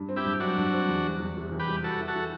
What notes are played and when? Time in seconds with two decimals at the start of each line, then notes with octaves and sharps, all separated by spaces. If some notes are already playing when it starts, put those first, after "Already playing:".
Already playing: G2
0.09 C4
0.16 E4 G4
0.25 G2
0.40 F#3 D4 F#4
0.57 G2
0.73 C4
0.88 E2
1.05 G3
1.20 E2
1.37 C3
1.52 E2
1.59 G4 B4
1.68 G3
1.84 F#4 G4 A4
2.00 E4
2.08 F#4 A4
2.15 E3